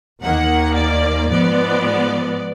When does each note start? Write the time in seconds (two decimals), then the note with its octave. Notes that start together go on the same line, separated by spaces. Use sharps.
0.23 D#2 D#3 A#3 F#5
0.76 D5
1.29 G#2 F3 G#3 B3 D5